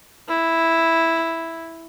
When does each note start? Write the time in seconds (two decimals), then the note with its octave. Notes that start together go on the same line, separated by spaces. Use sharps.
0.28 E4